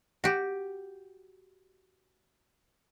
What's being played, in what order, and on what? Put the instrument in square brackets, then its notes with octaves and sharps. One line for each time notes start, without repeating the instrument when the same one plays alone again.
[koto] F#4 G4